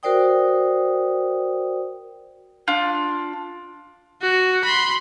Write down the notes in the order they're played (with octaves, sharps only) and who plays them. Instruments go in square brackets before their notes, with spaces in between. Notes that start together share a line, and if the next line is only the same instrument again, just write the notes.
[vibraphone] F#4 A#4 C5 D5 G5 D#6
[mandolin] D4 F4
[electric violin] F#4
B5 C6